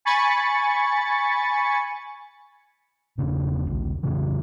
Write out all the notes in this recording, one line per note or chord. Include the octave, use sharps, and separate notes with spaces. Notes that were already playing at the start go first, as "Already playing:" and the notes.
G#5 B5 C#6 A6 C#7
E1 C#3 D4
A#1 D#2
F2 C#3 E3